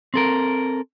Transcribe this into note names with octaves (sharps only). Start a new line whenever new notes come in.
C4 A4 A#4